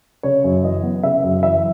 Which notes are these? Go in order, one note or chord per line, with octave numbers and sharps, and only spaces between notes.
C#3 C#5
F#2
E3 D#5
B3
C#3 E5
F#2
E3 E5